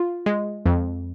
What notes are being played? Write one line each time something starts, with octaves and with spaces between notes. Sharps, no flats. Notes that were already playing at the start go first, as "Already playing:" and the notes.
Already playing: F4
G#3
F2